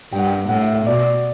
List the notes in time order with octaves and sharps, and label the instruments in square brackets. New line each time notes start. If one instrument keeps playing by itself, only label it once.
[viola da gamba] G2 [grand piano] G5
[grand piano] F#5
G5
[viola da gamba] A2 [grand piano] F#5
[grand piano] E5
E5
[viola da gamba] B2 [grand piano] D5